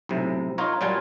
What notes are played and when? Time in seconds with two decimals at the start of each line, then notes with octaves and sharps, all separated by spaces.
0.09 B1 A2 C3
0.58 D#4 F4 A#4 C#5
0.81 A#2 F#3 G3 F4 G#5 A5